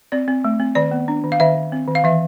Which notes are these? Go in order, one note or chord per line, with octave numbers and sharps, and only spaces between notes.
C4 D5
C4
A3
C4
D#3 D5
B3
D4
D#3
F5
D#3 E5
D#3
C4
D#3
F5
E3 E5